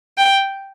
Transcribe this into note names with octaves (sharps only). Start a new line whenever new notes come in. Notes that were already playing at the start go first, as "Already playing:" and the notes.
G5